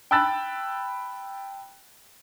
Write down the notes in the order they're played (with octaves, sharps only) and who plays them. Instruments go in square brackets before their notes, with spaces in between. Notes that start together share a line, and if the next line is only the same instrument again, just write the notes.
[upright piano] G5 A5 B5 E6 F#6 A6